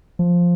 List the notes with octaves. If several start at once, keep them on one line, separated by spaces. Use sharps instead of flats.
F3